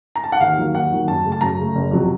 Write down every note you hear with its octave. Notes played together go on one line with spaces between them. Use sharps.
A#5
A5
F#5
D#2 F5
D#3 F#3 A#3
D#2 F#5
D#3 F#3 A#3
F#2 A5
C#3 A3
A5
F#2 A#5
C#3 A3
F#1
F2 C3 F#3